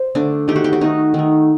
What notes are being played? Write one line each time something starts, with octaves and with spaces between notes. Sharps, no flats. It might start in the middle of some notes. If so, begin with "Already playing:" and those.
Already playing: C5
D3 A3 D4
D#3 A3 G4
F#4
G4
F#4
D#3 A3 D#4
D#3 A3